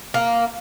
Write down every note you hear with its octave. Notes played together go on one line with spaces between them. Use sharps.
A#3